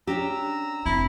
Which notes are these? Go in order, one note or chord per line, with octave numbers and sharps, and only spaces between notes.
C#4 D4 G4 A#5 E6
F1 C4 E4